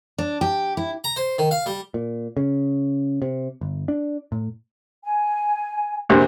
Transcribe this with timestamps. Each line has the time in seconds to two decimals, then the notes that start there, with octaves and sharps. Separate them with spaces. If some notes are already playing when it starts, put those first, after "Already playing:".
0.18 D4
0.41 G4
0.77 E4
1.04 A#5
1.16 C5
1.38 D#3
1.51 F5
1.66 G3
1.94 A#2
2.37 C#3
3.22 C3
3.61 G1
3.88 D4
4.32 A2
5.03 G#5
6.09 A#1 C3